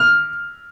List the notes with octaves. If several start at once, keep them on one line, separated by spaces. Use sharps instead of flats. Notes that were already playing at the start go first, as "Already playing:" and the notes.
Already playing: F6